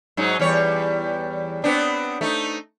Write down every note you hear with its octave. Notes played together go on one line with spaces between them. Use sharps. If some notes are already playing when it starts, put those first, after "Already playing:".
G#2 F#3 D#4
E2 G3 C#5
B3 C4 D4
A3 D#4